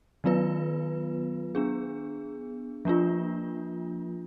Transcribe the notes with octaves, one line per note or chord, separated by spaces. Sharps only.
D#3 F#3 B3 F4 B4
B3 D4 G#4
F3 A#3 D4 F4